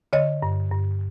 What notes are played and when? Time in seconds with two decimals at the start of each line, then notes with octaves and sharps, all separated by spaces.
0.13 D3 C#5 D#5
0.42 G2
0.72 G2